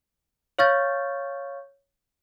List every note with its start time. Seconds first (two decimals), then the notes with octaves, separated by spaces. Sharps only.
0.59 C#5 F5 C#6 F6 G6 A6